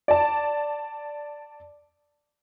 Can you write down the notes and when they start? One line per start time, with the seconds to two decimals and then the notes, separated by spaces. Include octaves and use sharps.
0.08 D5 A5